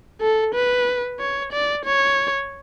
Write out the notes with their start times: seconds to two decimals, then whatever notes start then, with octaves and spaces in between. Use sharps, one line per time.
0.21 A4
0.55 B4
1.20 C#5
1.53 D5
1.85 C#5